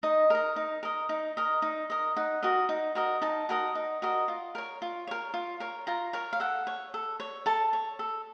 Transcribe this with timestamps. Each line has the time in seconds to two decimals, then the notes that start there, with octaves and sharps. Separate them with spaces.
0.03 D#4 D#5
0.30 A#4 D#5
0.56 D#4
0.83 A#4 D#5
1.09 D#4
1.37 A#4 D#5
1.62 D#4
1.90 A#4 D#5
2.17 D#4 F#5
2.43 F#4 A#4 D#5
2.69 D#4
2.95 F#4 A#4 D#5
3.22 D#4 A5
3.49 F#4 A#4 D#5
3.75 D#4
4.02 F#4 A#4 D#5
4.28 F4
4.55 A#4 C#5
4.82 F4
5.07 A#4 C#5
5.34 F4
5.60 A#4 C#5
5.87 F4 A#5
6.13 A#4 C#5
6.33 F5
6.40 A4 F#5
6.67 C#5
6.94 A4
7.20 C#5
7.46 A4 A5
7.73 C#5
7.99 A4